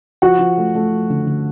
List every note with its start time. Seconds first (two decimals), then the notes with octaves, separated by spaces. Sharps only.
0.22 F3 F#4 F#5
0.39 F3
0.58 A3
0.75 A3
0.92 F3
1.10 D3
1.26 D3